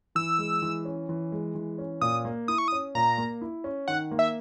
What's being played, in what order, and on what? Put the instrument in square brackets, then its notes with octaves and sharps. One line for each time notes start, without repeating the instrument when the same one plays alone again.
[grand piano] E3 [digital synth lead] E6
[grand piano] G#3
E3
C#4
E3
G#3
E3
C#4
[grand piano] A#2 [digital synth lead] D#6
[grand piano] A#3
[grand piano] E4 [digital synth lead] D#6
[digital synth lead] C#6
D#6
[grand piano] C#4
[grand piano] A#2 [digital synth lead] A#5
[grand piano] A#3
E4
C#4
[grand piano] D#3 [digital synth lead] F#5
[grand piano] A#3
[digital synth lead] E5